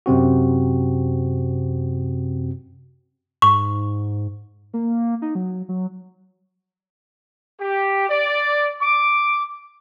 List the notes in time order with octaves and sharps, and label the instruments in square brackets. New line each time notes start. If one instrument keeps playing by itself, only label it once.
[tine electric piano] F#2 C3 C4 F#4
[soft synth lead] G#2 [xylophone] C#6
[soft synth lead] A#3
D#4
F#3
F#3
[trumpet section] G4
D5
D6